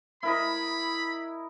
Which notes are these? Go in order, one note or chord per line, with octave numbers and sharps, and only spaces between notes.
E4 A#4 D#5 B5